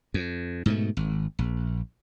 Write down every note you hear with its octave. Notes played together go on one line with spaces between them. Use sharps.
F2
G#2 B2 A3
G#1
A#1